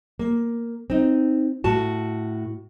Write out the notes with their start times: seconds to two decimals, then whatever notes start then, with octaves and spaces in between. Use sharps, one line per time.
0.19 A#3
0.90 C4 D#4
1.64 A2 F#4 A5